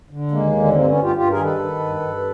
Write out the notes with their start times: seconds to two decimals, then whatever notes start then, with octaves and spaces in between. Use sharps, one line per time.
0.10 D3
0.31 D#2 G#3 A#3
0.53 D3
0.73 G2 A#3 C4
0.87 B3 C#4
0.94 G2
1.02 F4 G4
1.15 G2 F4 G4
1.29 G#4 A#4
1.37 D#3
1.44 A4 B4
1.58 D#3
1.79 G2
2.00 G2